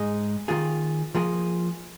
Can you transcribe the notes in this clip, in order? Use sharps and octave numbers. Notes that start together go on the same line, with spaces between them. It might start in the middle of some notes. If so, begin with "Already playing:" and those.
Already playing: G#2 G#3 D#4 G#4
D#3 A#3 F4 G#4
F3 A#3 G#4